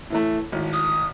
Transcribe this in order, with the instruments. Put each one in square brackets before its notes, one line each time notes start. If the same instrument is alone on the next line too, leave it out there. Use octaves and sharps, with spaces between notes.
[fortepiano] A2 E3 A3
G#1 A2
[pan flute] D#6